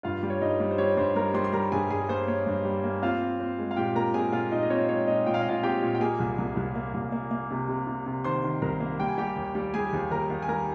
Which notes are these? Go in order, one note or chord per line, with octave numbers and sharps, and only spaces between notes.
G2 F4 F5
G3
C#5
G2 D#4 D#5
G3
C5
G3 C#5
G2 C5 C6
G3 A#4 A#5
G3 C5 C6
C6
G3 A#4 A#5
G2 G#4 G#5
G2 G#4 G#5
A#3 C5
A#3 C#5
G2
G3
A#3
C4 F4 F5
C4
C4
G#3
F5
A#2 G4 G5
A#2 A#4 A#5
C4 G#4 G#5
A#2 F4 F5
A#2 D#4 D#5
D#5
C4 C#5
G#3 C#5
A#2 D#4 D#5
A#2 G5
F5
D#5
A#2 F4 F5
C4 G4 G5
A#2
G5
A#3 G#4 G#5
C2
C2
C2
A#3
C2
A#3
A#3
C3
C3
C3
C3
D#3 C5 C6
D#3
C2 A#4 A#5
A#3
G3 G5
G#5
G3 G4 G5
D#2
G3
G3 G#4 G#5
D#2
D#2 A#4 A#5
D#2
G#5
G3 A#4 A#5